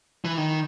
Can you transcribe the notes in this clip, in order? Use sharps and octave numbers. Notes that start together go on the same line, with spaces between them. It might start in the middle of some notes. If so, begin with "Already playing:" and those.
E3
D#3